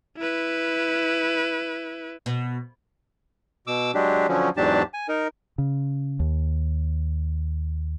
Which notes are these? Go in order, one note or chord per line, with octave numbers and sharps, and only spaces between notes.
E4 B4
B2
B2 D6 E6
F#3 G#3 D4 G4
D3 F3 F#3 C#4
E2 G#2 F#3 D4 G4 A5
G#5
D#4 A#4
C#3
D#2